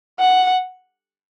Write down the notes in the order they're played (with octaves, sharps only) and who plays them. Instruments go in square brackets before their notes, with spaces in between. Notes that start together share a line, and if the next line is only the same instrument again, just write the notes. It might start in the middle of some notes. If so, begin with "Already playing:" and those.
[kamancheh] F#5